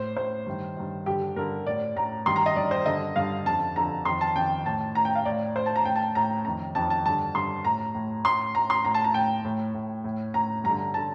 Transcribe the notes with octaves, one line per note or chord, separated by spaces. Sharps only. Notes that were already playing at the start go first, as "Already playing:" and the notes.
Already playing: A2 C5
A2 C5
G2 D#3
G2 D#3
G2 D3 G4
G2 D3 A#4
A2 D5
A2 A#5
G2 D#3 C6
A#5
D#5
G2 D#3 D5
C5
G2 D3 D#5
G2 D3 F5
F2 D3 A5
F2 D3 A#5
F2 D#3 C6
A5
F2 D#3 G5
A2 A5
A2 A#5
G5
F5
A2 D5
A2 C5
A5
A#5
A2 G5
A5
A2 A#5
F2 D#3 A#5
F2 D#3 A5
A5
G2 D3 A5
G2 D3 C6
A2 A#5
A2
A2 C6
A2 A#5
C6
A2 A#5
A5
A#5
A2 G5
A2
A2
A2
A2 A#5
G2 D3 A#5
D3 A5